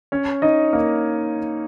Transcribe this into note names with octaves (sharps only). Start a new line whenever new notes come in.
C#4 C#5
D#4 D#5
A#3 A#4